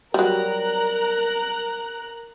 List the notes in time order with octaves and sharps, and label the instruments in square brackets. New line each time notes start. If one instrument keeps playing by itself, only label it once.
[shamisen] F#3 G3 [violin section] A#4 A#5 F#6